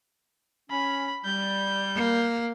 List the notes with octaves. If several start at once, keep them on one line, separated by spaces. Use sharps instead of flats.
C#4 B5
G3 G6
A#3